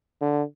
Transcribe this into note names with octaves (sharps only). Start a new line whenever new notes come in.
D3